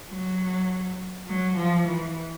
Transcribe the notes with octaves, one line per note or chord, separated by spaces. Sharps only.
F#3
F#3
F3
E3